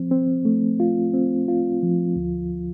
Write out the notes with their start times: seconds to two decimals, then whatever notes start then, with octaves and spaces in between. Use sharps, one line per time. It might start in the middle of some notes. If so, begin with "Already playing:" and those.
Already playing: F3 C4
0.11 C4
0.45 A3
0.80 F4
1.14 C4
1.48 F4
1.83 F3
2.16 D2